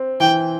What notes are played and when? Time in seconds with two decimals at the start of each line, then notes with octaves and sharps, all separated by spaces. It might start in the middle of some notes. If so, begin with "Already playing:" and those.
Already playing: C4
0.20 E3 G5